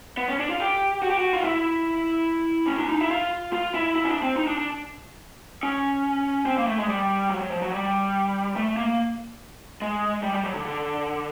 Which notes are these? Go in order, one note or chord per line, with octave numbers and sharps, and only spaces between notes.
B3
C#4
D4
F4
G4
F#4
G4
F#4
F4
E4
C#4
D4
D#4
E4
F4
F4
E4
E4
C#4
D4
C4
D#4
D4
D4
C#4
C4
A#3
A3
G#3
G3
F#3
F#3
F3
F#3
G3
A3
A#3
G#3
G3
G3
F#3
D3
D3